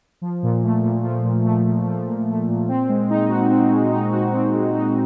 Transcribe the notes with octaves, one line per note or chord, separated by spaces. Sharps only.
F3
A#2
A3
A#2
F3
A#2
A3
A#2
F3
A#2
A3
A#2
C4
G#3
D#4
F#4
C4
G#3
D#4
F#4
C4
G#3
D#4